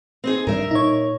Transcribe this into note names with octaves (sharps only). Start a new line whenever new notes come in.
C4 D#4 G#4
G#2 G3 D4 A#4 E5
A#2 D#4 C#5